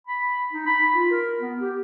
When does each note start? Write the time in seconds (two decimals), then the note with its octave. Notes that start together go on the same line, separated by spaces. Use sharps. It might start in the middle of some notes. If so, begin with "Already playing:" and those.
0.07 B5
0.53 D#4
0.66 B5
0.95 F4
1.11 A#4
1.40 B3
1.60 G4